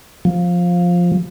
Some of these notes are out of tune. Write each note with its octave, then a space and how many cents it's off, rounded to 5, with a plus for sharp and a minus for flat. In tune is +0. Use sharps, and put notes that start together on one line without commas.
F3 +10